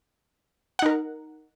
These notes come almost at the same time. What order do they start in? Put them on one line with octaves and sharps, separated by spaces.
F#5 D#4 A#4